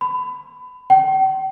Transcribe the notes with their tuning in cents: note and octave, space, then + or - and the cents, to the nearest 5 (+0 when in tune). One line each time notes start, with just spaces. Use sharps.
B5 +25
G5 -40